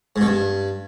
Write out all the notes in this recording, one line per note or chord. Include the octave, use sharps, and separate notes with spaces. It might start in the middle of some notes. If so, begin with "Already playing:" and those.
G#2
B2
G2